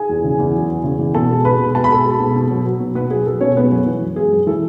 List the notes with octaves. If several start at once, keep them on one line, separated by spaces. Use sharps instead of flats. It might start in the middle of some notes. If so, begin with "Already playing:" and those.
Already playing: G#4 G#5
E2
C#3
E2
F#3
E2
C#3
E2
B2 A4 A5
G#3
G#3 B4 B5
B2
B2 A5
B5
G#3 A4 A5
G#3
B2
B2
F#3
F#3
B2
B2 B3 B4
F#3 G#4
F#3 A4
B2 C#4 C#5
G#3 B3 B4
F#2
E3
F#2
G#3 G#4
F#2
E3 A4